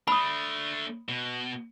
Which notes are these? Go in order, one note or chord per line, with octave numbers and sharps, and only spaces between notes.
A3 D4 B5 D#6
B2